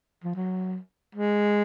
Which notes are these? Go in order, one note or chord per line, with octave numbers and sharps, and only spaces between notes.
F3
F#3
G#3